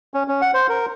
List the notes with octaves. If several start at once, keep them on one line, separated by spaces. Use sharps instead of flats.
C#4
C#4
F#5
C5
A#4